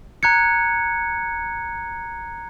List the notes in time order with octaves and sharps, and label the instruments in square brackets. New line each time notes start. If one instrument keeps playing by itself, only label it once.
[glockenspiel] A#5 F#6 G#6 C#7